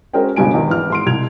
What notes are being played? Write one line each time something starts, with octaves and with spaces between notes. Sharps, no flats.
G#3 C#4 F#4 A#4 C5 G5
G1 C#2 B2 G3 G#5 D7
E2 G#2 D#3
G#1 E3 F6
G#2 C6 D7
C2 G#6 F7